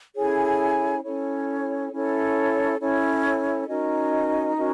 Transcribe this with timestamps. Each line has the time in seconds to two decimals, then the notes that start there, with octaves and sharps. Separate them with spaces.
0.15 C#4 E4 G#4 A4 C#5 G#5
1.04 C#4 E4 A4 C#5
1.91 C#4 E4 A4 C#5
2.80 C#4 E4 A4 C#5
3.68 C#4 D#4 F#4 A#4 D#5
4.56 C#4 F#4 A#4